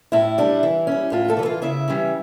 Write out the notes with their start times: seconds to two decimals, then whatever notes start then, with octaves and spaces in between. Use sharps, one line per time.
0.12 A2 E4
0.38 G3 D4
0.63 E3
0.87 G3 C#4
1.12 A2 F4
1.28 A3 A4
1.37 E3 G3
1.45 F4 F5
1.62 C#3 E4 E5
1.88 E3 G3 C#4